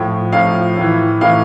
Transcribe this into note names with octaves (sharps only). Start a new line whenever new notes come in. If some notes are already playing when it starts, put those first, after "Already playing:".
Already playing: A2 F3
A2 F3 F5
A2 E3
A2 E3 F5